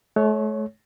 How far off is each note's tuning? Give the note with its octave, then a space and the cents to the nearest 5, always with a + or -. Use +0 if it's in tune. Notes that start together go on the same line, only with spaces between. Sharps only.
A3 -40 C#5 +0